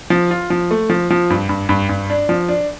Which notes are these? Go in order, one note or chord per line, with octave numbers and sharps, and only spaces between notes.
F3
F4
F3
A3
F3
F3
G2
G2
G2
G2
D4
F3
D4